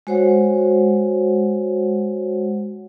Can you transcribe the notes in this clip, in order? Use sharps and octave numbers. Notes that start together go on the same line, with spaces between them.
G#3 F#4 C5 C#5 F#5